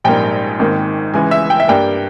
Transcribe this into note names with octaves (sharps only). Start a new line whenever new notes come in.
A#1 G#2 G3 A#3 G5
G#1 G#2 D#3 A#3
C#2 C#3 E3 G#3 G#5
E5
G5
E5
G2 G3 A#3 G5